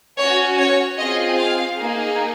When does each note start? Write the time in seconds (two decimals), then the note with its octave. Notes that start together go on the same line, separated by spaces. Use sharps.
0.18 C#4 F#4 C#5
0.58 C#5
0.98 C4 F4 G#4 D#5
1.37 F5
1.77 A#3 D#4 G#4